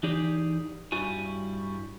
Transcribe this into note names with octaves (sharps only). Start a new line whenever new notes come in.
E3 D#4 G4 G#4 D5
G2 G3 E4 F#4 G#5